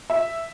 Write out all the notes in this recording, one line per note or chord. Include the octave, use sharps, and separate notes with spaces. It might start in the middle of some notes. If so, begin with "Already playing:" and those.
E5